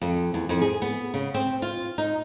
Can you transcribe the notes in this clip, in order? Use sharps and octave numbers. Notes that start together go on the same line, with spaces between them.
F2
E2
F2
G#4
B3
C#3
C4
F4
D#4